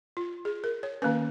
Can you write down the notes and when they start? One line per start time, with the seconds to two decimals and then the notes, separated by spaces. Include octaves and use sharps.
0.17 F4
0.45 G#4
0.64 A#4
0.83 C#5
1.02 D#3 A#3 C#4 B4